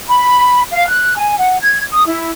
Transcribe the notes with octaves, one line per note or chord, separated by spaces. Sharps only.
B5
F5
F#6
G#5
F#5
G#6
D#6
E4